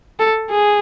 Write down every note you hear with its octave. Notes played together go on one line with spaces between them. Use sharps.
A4
G#4